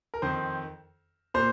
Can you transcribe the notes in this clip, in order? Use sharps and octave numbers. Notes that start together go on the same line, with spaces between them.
A#4
F2 D#3 C4 C5
A#2 C5